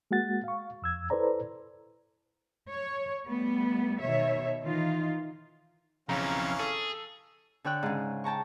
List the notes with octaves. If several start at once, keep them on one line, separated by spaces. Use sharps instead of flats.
G#3 A#3 F#4 F#5 A6
F5 C#6
F2 E6 G#6
E4 A4 B4 C5 D5 A#5
C#5
G3 A3 B3
B2 D#3 C#5 E5
D#3 E3 D#4 F4
B1 F2 C#3 E3 C#4 F5 A#5
G#4 A4
D3 C#5 G5 F#6
G#2 C#3
G5 A5 A#5 C#6